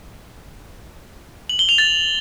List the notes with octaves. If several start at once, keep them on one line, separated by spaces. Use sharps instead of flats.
F#7
G7
F7
A6